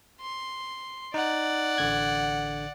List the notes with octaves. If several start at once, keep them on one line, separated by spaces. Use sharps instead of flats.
C6
D#4 D5 F#5
A1 D3 G#6